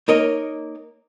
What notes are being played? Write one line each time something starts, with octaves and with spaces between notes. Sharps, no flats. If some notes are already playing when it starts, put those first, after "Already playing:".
A#3 D#4 A#4 C#5 D#5